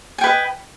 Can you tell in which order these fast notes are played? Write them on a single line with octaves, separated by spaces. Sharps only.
G#5 G5 B4 D#5